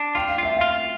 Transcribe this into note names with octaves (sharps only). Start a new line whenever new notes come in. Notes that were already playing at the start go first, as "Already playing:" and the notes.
Already playing: D4
F4 G5
F5
F4 E5
F4 F5